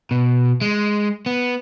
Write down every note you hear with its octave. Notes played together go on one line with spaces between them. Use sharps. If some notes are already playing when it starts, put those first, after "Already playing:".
B2
G#3
B3